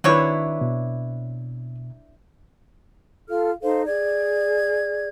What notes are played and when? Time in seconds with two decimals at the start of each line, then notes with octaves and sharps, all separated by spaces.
0.04 D#3 F#3 C4 D4 E4 B4 C#5
0.61 B2
3.29 F4 A4 F5 F6
3.62 D#4 A4 C5 F5
3.86 G#4 D5 G#6